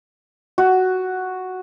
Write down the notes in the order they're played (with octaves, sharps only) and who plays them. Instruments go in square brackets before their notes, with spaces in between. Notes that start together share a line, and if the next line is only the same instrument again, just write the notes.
[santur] F#4